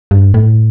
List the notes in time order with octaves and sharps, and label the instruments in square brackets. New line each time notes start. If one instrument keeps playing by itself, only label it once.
[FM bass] G2
A2